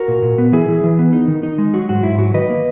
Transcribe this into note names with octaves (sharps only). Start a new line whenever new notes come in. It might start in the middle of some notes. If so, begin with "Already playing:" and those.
Already playing: F#4 A#4
A#2
A#2
B3
E3 E4 G#4
E3
E3
B3
D#4
D#3
D#4
G#3
F#3 F#4
G#2 F#4
G#2 E4
F#3 F#4
D#3 B4 D#5
A#3